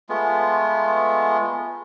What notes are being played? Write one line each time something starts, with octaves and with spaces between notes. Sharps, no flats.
G#3 A3 B3 F4